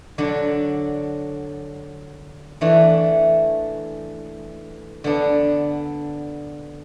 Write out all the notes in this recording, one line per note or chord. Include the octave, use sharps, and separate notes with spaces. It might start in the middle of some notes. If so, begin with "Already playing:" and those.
D3 F#3 D4
E3 A3 D4
D3 B3 D4